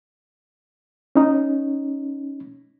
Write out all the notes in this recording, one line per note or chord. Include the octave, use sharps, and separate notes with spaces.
C#4 D#4